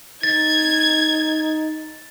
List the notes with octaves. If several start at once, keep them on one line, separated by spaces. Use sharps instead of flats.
D#4 G#6 A6